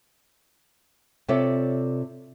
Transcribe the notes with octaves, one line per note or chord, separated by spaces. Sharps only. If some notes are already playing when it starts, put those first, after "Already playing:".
C3 F4 A4 C#5 D5 E5